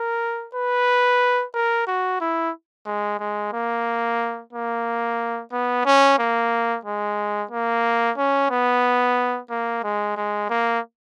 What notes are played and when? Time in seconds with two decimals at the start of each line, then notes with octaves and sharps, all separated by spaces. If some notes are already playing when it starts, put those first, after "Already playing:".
Already playing: A#4
0.55 B4
1.55 A#4
1.87 F#4
2.21 E4
2.86 G#3
3.20 G#3
3.53 A#3
4.53 A#3
5.52 B3
5.85 C#4
6.19 A#3
6.85 G#3
7.51 A#3
8.18 C#4
8.50 B3
9.50 A#3
9.83 G#3
10.17 G#3
10.50 A#3